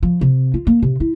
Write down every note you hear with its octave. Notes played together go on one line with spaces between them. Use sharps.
F3
C3
F4
A#3
C3
E4